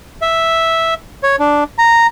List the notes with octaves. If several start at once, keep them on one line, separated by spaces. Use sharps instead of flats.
E5
C#5
D4
A#5